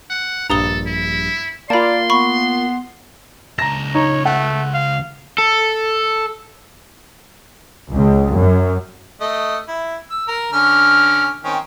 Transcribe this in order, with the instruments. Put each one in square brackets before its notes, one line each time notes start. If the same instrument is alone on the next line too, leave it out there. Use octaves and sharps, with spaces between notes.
[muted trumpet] F#5
[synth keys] A#1 G2 [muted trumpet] A4 [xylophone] A#5 D#6 G7
[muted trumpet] E4
[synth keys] A#3 F4 [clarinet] D5 [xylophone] A5 B5 [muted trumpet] C6
[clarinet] B3 [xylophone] B5 C#6
[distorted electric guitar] C#2 A5 [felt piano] A#5 A#6
[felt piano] D#4 [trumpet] C#5
[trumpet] A3 [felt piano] F#5
[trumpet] F5
[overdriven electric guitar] A4
[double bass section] C#2
F#2
[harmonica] A3 D#5
E4
E6
A#4
D3 C#4 F6
D#3 C4 C#4